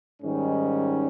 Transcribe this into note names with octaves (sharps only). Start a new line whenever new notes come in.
G#2 D#3 G3 C#4